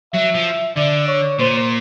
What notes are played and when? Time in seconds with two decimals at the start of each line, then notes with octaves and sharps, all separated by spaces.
0.14 F#3 E5
0.35 F3
0.76 D3 D5
1.08 C#5
1.39 A#2 C5